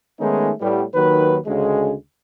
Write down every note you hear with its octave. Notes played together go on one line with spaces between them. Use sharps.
D#3 G#3 A3 B3 C#4 D#4
A2 G3 B3
D#2 D#3 F#3 B4
D2 C#3 G#3